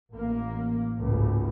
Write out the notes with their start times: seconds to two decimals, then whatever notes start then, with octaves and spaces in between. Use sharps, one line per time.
0.10 A1 A#3
0.99 G#1 C#2 A2